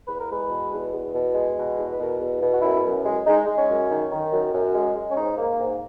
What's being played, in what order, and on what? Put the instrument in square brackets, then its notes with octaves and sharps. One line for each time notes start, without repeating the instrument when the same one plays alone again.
[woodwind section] E2 B4
A#4
G#3 B4
B2
E2
E2
B2
G#3
B2
E2
B4
B2 A#4
E2
B2
F#4
F#2 E4
F#2
G#3
G#3 D#4
G#3
C#4
F#2
D#3
D#3
F#2
F#2
G#3
G#3
C#4
G#2 D#4
A#3
G#2